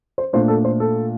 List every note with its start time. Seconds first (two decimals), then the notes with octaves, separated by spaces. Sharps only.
0.18 C5
0.33 A#2 A3 D4 C5
0.48 A4
0.65 C5
0.80 A4